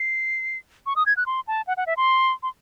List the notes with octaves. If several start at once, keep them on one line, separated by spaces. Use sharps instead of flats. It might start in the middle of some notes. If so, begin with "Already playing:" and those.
Already playing: C7
C#6
D#6
G#6
F#6
C6
A5
F#5
F#5
E5
C6
C6